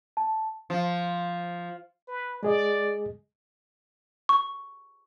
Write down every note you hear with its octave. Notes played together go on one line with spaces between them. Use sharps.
A5
F3
B4
G#3 G#4 D5 D#5
C#6